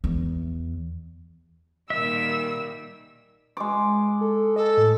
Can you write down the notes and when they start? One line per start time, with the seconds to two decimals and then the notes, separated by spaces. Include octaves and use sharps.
0.04 E2
1.90 A#2 D#3 G3 E5 E6
3.57 G#3 D6
4.21 A4
4.56 A4 D#5
4.77 A2